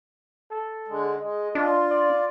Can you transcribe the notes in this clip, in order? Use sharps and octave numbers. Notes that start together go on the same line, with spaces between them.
A4
D3 G#3
G#3 D#5
D4 F4
D5